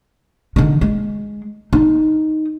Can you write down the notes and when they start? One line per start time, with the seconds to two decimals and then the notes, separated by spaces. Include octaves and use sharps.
0.56 D3 D#3
0.81 G#3
1.73 D#4